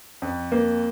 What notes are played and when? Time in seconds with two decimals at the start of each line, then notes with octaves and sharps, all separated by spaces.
0.22 F2
0.52 A#3